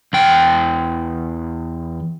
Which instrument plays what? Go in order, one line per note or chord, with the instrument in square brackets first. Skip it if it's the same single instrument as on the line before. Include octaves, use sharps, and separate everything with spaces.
[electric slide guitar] E2 G5